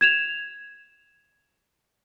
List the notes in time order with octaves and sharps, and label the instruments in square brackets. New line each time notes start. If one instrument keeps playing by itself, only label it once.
[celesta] G#6 E7 F7